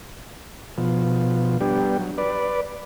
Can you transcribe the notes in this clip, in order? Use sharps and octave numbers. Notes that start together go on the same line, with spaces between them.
B2 F3
G3 B3 D4 G4
F#3
B4 D5